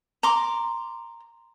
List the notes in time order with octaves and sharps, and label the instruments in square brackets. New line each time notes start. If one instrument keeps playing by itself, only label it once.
[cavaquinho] A#5 C6 D6